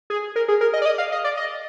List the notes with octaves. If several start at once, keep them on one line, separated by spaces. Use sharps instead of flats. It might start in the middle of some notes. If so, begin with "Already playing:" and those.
G#4
A#4
G#4
A#4
D#5
D5
D#5
F5
D#5
D5
D#5